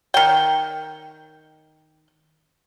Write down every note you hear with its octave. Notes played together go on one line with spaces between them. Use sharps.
D#3 G5